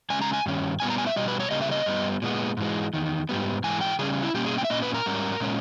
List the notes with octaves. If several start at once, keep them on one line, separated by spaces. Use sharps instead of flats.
C#3 G#3 C#4 G#5
A#5
G#5
G2 D#3 C#4
A#2 G3 B3 G#5
A#5
G#5
E5
B2 G3 D#5
B4
C#5
C#3 G3 A#3 C#4 D#5
E5
D#5
G2 G3 B3
A#2 G#3 B3
G#2 E3 G#3
E2 D#3
G#2 G3 B3
G#2 E3 G#3 G#5
G5
C#3 G3 C#4 G#4
E4
B2 G3 A#3 C#4 G4
G#4
G5
E5
A#2 A#3 C#4 D#5
B4
A#4
G#2 G3 C#4
A#2 G#3 C#4